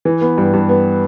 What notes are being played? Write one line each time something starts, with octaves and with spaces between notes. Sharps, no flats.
E3
B3
G2
G2
B3